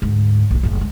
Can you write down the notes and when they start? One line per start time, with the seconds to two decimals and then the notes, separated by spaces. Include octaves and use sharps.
0.02 D2 G#2
0.51 A#1 F4
0.63 F#1 A2
0.77 C#2 G#3